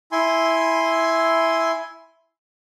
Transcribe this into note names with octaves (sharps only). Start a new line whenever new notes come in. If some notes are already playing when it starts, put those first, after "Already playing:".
E4 G#5 C6